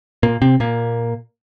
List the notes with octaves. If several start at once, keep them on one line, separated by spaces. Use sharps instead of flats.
A#2 A#3
C3 C4
A#2 A#3